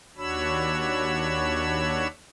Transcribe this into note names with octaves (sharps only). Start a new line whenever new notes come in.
D#2 D4 F#4 C#5 B5 E6